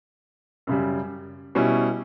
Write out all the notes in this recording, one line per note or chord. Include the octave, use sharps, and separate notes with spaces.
F#2 C#3 G3
B2 G3 C#4 E4